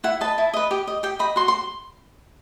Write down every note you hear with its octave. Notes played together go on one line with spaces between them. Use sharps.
E4 F#5
B4 D#5 A5
E4
B4 D#5
G4
D#5
G4 G5
D#5 B5
F#4 C6
C6